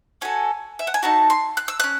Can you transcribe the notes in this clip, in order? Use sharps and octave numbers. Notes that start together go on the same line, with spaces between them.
C#4 F#4 A4 G#5
E5
F#5
G#5
A3 D#4 F#4 A5
C6
F#6
E6
C#4 F#6